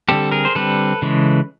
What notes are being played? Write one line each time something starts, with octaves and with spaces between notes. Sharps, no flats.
D3 G3 C4 G4 A4
G#4 A#4
C5
D3 G3 C4 A4 B4
C#3 E3 G#3